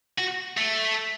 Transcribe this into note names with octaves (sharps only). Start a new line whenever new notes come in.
F#4
A3